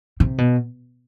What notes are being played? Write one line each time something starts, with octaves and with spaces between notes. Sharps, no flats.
C3
B2